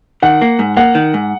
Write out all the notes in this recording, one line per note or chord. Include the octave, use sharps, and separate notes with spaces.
D#3 F#5
A#3
G#2
A#3 F#5
D#3
G#2